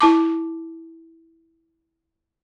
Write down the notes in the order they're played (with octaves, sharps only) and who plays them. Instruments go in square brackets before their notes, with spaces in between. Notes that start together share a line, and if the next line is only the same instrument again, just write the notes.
[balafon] E4 A5 D6